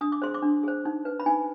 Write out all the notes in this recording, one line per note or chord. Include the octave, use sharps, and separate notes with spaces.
D4 D#6
D6
G#4 C5 C6
D6
D4
G#4 C5
D#4
B4
B5
D#4 G#5